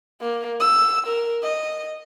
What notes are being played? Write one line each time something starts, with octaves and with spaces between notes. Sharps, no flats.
A#3
E6
A#4
D#5